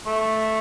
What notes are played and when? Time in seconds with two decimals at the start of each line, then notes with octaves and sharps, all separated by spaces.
0.06 A3